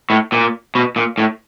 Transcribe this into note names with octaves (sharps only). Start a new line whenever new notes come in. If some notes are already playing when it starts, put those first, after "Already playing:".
A2
A#2
B2
A#2
A2